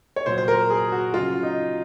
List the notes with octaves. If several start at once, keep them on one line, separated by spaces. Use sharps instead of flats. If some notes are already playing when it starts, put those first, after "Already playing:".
C#5
A#2 F#3 C5
C5
A#4
G#4
F#4
C#3 F#3 F4
D#4